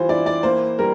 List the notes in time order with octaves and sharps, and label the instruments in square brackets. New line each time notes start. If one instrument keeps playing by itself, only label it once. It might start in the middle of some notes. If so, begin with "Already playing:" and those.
Already playing: [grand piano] E3 G3 [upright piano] F4 C5
[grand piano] E4 [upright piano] D5
[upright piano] D5
[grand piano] A#3 [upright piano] C5
[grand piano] G3 [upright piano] A#4